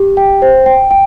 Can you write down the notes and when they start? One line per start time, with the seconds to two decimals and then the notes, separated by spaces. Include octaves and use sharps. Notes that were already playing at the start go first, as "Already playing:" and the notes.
Already playing: G4
0.17 G5
0.42 C5
0.66 G5
0.91 G5